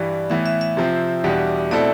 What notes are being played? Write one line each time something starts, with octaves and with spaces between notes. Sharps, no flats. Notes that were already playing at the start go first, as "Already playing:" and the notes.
Already playing: G2 E3 G3 D5
A2 E3 B3 E5
E5
E5
C3 F3 C4
E2 B2 G3 D4 G4
B2 A3 C4 E4 A4 D5